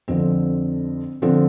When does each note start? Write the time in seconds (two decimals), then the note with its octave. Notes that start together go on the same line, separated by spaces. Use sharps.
0.08 F2 D3 F3 C4
1.22 D3 F3 C4